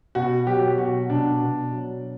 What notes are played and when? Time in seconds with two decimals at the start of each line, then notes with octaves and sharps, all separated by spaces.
0.15 B2 F#4
0.47 F#3 G4
0.78 B2 F#4
1.10 B2 D4
1.42 B2
1.73 F#3